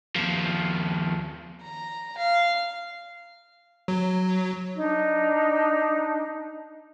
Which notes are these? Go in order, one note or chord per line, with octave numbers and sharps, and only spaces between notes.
D#2 F3
A#5
F5
F#3
D4 D#4